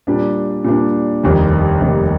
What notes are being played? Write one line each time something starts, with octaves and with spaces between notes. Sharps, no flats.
A#2 G3 D4
A#2 G3 D4
F1 D#2 D#3 G3
F1 D#2 D#3 G3